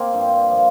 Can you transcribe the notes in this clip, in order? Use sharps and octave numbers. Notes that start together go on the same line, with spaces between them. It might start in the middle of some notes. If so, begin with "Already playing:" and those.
Already playing: A#2 A#3 C4
G2 F3
A#2 F3